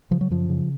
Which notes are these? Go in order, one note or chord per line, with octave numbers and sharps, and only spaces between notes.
C#3 F3
F#3
F#2 F3
C#3